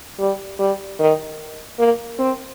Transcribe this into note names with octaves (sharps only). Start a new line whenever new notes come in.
G3
G3
D#3
A#3
C4